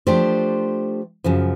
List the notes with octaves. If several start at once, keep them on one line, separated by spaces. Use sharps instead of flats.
F3 A3 D4 G4 C5
F#2 C#3 F3